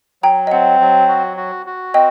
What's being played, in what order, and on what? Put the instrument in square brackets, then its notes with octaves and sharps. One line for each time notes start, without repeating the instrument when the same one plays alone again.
[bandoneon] F#3 [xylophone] G5 A#5
[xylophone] D#5
[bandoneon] C4 [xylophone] F#5
[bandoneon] F#3
F#4
F#4
F#4
[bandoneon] C4 [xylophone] D#5 G5